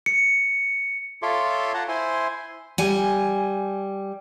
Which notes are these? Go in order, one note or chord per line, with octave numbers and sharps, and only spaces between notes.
C#7
F4 A4 C#5 E5 C6 D6
F#5 A5 A#5
E4 C5 G#5 C6
G3 G#5